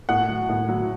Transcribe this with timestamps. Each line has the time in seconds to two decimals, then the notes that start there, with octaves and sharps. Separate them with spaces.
0.09 A2 F#5
0.29 F#3
0.49 A2
0.69 F#3